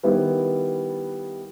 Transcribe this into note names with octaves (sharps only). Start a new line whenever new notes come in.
D#3 G3 B3 E4 B4